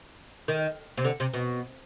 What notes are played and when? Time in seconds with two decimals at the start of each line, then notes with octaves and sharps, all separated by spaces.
0.48 D#3
0.97 C3
1.05 D3
1.20 C3
1.34 B2